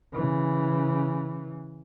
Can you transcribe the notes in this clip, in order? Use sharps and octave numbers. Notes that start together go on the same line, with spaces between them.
C#3 E3